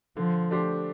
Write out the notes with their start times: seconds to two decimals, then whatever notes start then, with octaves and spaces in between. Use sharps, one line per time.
0.17 D3 F3
0.50 A3 D4 G4 C5